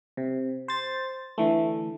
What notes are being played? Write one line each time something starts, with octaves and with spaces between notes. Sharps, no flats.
C3
C5 A6
D3 E3 A3